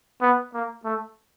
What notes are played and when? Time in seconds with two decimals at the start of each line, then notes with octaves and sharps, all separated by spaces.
0.22 B3
0.54 A#3
0.85 A3